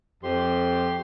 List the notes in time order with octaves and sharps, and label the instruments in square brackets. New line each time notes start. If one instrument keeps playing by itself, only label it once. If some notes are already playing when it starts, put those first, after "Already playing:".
[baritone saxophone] F2 [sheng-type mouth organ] G4 C6